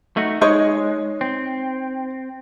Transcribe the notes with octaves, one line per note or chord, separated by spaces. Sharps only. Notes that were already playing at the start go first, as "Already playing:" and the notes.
A3 D#4 F#4
G#3 D#4 C#5 D#5
C4